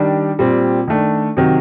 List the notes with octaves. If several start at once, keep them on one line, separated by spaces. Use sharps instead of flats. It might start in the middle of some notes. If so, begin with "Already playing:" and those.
Already playing: D#3 G3 D4
A#2 G3 C4
D#3 A3 D4
C3 D#3 F#3